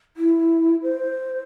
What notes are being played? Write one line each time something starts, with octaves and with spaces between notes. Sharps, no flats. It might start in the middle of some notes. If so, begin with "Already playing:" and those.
E4
C5